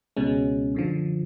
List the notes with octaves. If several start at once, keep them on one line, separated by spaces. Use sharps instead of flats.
C#2 B2 G#3 C#4
F#2 D3 F3